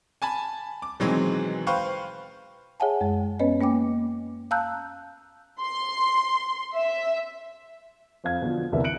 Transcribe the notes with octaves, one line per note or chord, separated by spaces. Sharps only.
G#5 A5 B5
D6
B2 D#3 E3 F#3 G#3 C4
B4 C5 F5 G5 C#6
G#4 C#5 E5 F#5 G#5 A5
F#2 G#3
B3 C#4 B4 C#5 D#5
A#3 C#4 G5 D6
F5 A5 A#5 E6 F#6 G6
C6
E5
F2 C5 F5 G#6
B2 D3 F3
C2 D3 E3 B3 A#4 E5
F#6 C#7 D7 F#7